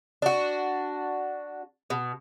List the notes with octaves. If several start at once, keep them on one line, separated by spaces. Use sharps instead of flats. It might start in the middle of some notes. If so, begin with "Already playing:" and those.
D4 F#4
B2